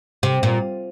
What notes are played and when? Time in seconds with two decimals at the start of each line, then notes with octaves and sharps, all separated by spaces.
0.23 C3
0.43 A#2